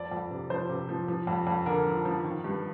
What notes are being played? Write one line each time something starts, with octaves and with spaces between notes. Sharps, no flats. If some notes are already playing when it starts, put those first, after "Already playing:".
Already playing: F2 D5
F2
C3
F3 C5
C3
F3
F3
F2
F2
D3 A#4
F3
F3
D#3
G2